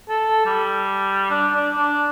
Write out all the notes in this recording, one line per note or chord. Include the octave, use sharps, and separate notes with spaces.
A4
G3
D4
D4
D4